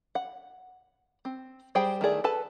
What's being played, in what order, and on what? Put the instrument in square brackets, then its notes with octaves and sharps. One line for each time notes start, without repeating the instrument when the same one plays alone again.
[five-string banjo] F#5
C4
G3 G#4 C5 G5
D#3 A3 E4 G#4 D5
A4 B4 A5